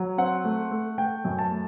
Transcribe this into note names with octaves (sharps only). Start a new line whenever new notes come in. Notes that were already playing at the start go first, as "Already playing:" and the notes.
Already playing: F#3
C4 F#5
A3
A3
A3 G5
F#2
A5
A3